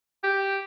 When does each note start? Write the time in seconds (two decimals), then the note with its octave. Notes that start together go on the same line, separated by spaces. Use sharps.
0.24 G4